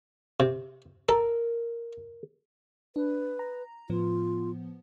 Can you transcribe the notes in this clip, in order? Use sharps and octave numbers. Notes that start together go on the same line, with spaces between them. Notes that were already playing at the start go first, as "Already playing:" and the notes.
C3
A4 A#4
D4 B4
A#5
A2 F3 B3 F4